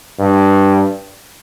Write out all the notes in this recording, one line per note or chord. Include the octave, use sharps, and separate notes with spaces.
G2